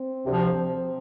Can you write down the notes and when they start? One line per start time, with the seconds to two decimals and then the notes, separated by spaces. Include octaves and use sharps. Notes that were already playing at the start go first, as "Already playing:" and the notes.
Already playing: C4
0.25 D2 C3 F3